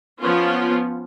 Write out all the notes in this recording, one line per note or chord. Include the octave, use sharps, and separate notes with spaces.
F3 B3 C#4 F4